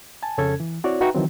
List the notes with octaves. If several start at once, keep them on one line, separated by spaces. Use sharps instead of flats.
G#5 A5
F2 C#3 C#4 A4 G#6
E3
C4 E4 F#4 C#5 D5
D#4 F#4 B4 E5 G5 A#5
D#3 E3 F#3 C4